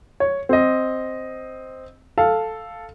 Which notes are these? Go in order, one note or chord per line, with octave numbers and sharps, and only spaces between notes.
C#5
C4 D#5
A4 F5